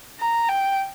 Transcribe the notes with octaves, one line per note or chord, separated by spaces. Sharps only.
A#5
G5